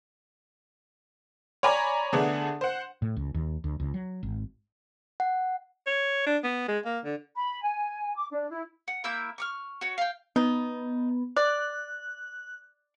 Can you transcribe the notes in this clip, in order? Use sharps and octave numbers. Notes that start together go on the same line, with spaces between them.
C#5 D5 G#5 A#5 B5 D6
D3 A3 B3 D4 G#4
C5 F#5
A2
C#2
D#2
D2
C#2
F#3
G#1
F#5
C#5
D4
B3
G#3
A#3
D3
B5
G#5
D6
D4
E4
F#5
A#3 E4 E6 G6
C#6 D6 F6
F#4 C#5
F5 G5
B3 D#4
D5 F#6